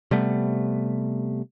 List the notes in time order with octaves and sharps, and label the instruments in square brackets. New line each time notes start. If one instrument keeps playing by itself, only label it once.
[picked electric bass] C3 G3 A3 B3